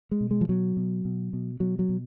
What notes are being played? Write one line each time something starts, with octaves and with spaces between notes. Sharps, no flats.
G#3
B2
G#3
F3
B2 F#3
B2
B2
B2
B2 F#3
F#3
B2